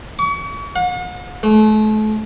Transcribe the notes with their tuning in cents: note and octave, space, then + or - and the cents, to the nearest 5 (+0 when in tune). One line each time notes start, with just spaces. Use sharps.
C#6 +40
F#5 -45
A3 -35